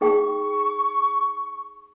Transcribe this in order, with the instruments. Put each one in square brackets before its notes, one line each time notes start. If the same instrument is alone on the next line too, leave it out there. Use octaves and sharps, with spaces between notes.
[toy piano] D#4 G#4 G5 [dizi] C#6